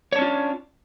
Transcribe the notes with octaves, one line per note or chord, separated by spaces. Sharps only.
C#4 D4 F4 C#5